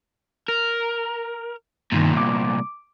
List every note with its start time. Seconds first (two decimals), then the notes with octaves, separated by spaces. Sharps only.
0.48 A#4
1.92 C2 G2 A#2 D#3
2.17 D6